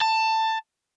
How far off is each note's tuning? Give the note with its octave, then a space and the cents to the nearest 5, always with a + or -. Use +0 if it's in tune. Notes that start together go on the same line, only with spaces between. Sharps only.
A5 +15